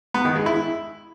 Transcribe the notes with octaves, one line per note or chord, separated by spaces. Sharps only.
B3
D#3
G#3
E4